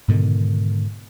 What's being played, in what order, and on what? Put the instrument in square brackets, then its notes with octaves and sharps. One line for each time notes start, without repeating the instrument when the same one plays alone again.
[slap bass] G#2 B2 D3 D#3